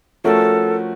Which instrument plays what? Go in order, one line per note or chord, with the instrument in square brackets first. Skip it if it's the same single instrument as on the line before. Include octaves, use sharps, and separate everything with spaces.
[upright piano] F3 A3 C#4 F#4 A#4 [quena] A4